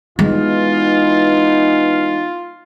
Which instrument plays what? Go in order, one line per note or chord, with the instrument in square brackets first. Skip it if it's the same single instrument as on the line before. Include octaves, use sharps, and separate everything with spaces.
[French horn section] E3 B3 D#4 [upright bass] G#3 [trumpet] F4